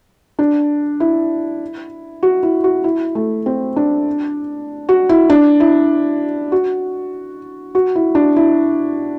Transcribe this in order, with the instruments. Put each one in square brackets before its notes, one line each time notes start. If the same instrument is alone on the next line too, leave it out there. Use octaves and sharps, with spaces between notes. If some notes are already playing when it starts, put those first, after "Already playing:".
[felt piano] D4
E4
F#4
E4
F#4
E4
A3
C4
D4
F#4
E4
D4
E4
F#4
F#4
E4
D4
E4